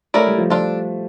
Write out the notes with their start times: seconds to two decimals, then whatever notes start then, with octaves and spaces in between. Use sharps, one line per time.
0.14 A3 C#4 E4 A#4 D5
0.27 G3
0.38 F3
0.50 F3 D4 F4 A4